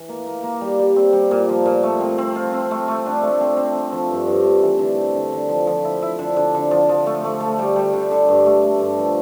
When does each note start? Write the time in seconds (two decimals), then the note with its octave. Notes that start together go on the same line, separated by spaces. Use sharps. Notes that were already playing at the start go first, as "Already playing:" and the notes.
Already playing: E3
0.09 A#3
0.27 A#3
0.43 A#3
0.61 G3
0.79 G3
0.96 C4
1.13 G3
1.31 A#2
1.49 F3
1.66 A#2
1.83 A3
2.00 C4
2.18 C4
2.36 F4
2.53 C4
2.71 A3
2.88 A3
3.06 D4
3.23 A3
3.41 C4
3.57 C4
3.74 C4
3.92 F3
4.10 G2
4.27 G2
4.44 A3
4.62 E3
4.79 D3
4.97 C4
5.15 D3
5.32 D3
5.49 F3
5.67 F3
5.85 E4
6.02 E4
6.19 D3
6.36 D3
6.54 D3
6.71 F3
6.89 F3
7.06 A3
7.24 A3
7.41 A3
7.59 G3
7.76 G3
7.93 D3
8.11 D3
8.28 G2
8.46 A3
8.63 A3
8.80 G2
8.98 F3